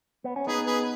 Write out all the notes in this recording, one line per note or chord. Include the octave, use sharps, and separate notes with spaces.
B3
C#4
B3 D#4 G#4 B4
G#4 B4